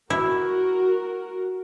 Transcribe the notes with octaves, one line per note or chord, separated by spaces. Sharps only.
E4 F#4 A#4